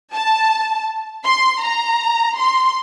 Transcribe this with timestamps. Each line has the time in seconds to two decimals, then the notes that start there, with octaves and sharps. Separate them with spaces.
0.13 A5
1.25 C6
1.63 A#5
2.36 C6